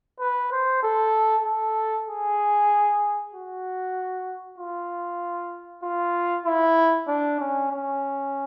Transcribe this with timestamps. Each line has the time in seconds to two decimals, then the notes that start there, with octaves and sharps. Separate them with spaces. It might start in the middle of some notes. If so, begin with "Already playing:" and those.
0.20 B4
0.52 C5
0.83 A4
1.46 A4
2.07 G#4
3.33 F#4
4.58 F4
5.83 F4
6.46 E4
7.08 D4
7.40 C#4
7.71 C#4